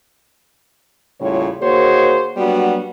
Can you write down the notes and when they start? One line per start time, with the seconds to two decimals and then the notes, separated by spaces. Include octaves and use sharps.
1.20 D#2 A2 C#3 G3 F4 C#5
1.62 D#3 A#3 F#4 G#4 C5 C#5
2.37 F#3 G3 A#3 B3 D4 F#4